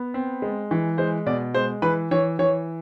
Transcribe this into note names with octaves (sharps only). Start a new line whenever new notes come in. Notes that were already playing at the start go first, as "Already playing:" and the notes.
Already playing: B3
C4
G#3
E3
G#3 C5
B2 D5
G#3 C5
E3 B4
E3 C#5
E3 C#5